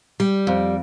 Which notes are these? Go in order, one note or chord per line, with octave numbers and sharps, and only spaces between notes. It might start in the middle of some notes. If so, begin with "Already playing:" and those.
G3
F2